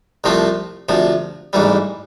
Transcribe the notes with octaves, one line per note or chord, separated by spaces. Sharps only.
C2 C3 F3 A3 C4
D2 C3 F3
A1 G#2 E3 G3